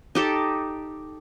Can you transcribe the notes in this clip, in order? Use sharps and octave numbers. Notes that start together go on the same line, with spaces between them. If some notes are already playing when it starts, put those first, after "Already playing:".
D#4 G4 A4